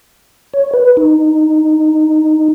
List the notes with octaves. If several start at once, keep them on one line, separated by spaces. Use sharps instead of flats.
C#5
B4
D#4